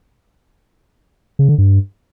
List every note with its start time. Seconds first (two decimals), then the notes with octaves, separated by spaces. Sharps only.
1.39 C#3
1.49 D3
1.58 G2